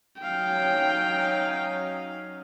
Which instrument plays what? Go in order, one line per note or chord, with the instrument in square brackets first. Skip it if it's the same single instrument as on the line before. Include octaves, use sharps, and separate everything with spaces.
[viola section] F#3 C#4 D#4 [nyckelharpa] F5 [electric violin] G5